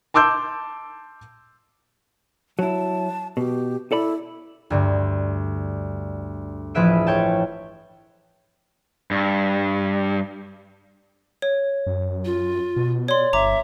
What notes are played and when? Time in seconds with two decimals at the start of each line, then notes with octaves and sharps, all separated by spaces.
0.14 A5 C6 D6 E6 G6
2.59 F#3 E4 A5
3.37 B2 G4
3.92 E4 A4 D5 B5
4.70 D2 G2 D3
6.75 A1 F3 G#4 B4 E5 D7
7.07 C#5 G5 A5
9.11 G2
11.42 C#5
11.87 F#2
12.25 F4
12.76 B2
13.08 C#5 D5 C6
13.33 G1 E5 A#5 D6